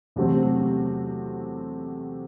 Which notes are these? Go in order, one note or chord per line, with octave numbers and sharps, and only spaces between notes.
E2 C3 F#3 A3 C4